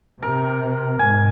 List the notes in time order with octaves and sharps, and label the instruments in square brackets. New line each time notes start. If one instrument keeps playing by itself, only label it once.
[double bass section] C3 [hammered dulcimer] A#4
[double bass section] G#2 [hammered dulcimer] G#5